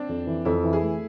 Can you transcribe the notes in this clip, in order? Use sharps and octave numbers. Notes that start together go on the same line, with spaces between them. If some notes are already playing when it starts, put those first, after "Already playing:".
Already playing: C4 D4
F2
E3
F2 E4
E3
G#4
A3